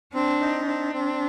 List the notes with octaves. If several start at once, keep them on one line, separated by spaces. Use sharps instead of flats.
C4 D4
D#4
C4 D4
C4